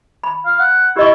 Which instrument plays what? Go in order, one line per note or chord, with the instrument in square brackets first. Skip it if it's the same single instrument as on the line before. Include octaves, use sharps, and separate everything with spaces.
[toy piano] B5
[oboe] F5
F#5
[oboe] E4 [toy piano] G4 D#5 C#6